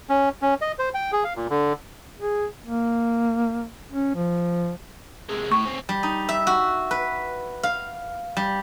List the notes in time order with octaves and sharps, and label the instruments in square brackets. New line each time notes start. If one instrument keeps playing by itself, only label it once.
[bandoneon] C#4
C#4
D#5
C5
G5
G#4
F5
A#2
D3
[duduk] G#4
A#3
C#4
F3
[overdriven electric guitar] C3 G#3
[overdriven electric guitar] A2 [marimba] C#6
[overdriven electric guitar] C4 C#4
[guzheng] G3
D#4
E5
F#4
B4
F5
G3